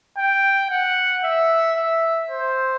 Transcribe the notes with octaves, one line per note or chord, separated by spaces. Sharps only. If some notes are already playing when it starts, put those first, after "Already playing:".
G5
F#5
E5
E5
C5